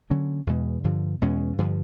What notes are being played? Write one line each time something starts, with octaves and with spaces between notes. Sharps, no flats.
D3 F#3 A#3 C#4
E2 B2 G#3
G2 D3 F3
E2 B2 G#3 C#4
G2 D3 F3